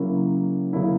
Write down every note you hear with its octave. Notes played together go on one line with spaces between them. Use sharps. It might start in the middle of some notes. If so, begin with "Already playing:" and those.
Already playing: C#3 F#3 A#3 C#4 E4
C#3 F#3 A#3 C#4 E4